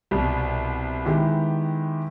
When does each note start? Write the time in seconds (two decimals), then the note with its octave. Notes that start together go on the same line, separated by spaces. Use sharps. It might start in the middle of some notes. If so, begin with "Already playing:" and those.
0.11 C2 B2 G3
1.05 D#3 G#3 B3 E4 G4